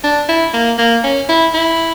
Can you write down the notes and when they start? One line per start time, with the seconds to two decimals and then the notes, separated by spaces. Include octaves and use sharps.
0.04 D4
0.29 E4
0.53 A#3
0.78 A#3
1.04 C#4
1.29 E4
1.54 E4